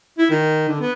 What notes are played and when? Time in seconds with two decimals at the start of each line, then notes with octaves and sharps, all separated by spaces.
0.18 E4
0.30 D#3
0.68 D3
0.81 B3